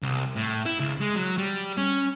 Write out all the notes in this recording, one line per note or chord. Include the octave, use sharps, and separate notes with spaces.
C2
A2
E4
C#2
G#3
F#3
G3
C#4